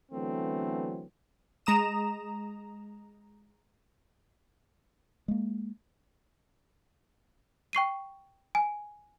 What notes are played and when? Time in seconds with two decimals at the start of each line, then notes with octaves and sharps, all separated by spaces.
0.12 D3 E3 F#3 A3 B3 C4
1.66 G#3 A#5 D#6 E7
5.28 G#3 A#3
7.73 G5 C#6 C7 D#7
8.55 G#5